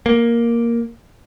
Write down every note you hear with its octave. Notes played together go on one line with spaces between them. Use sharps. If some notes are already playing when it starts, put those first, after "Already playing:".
A#3